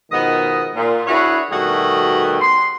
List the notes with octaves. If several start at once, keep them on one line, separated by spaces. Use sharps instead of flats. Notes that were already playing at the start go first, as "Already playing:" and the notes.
B2 D#3 F3 G#3 B3 D#5
A#2
D4 E4 F#4 G#4 B4 C#5
B2 D#3 G3 A3 F#4 G#4
C6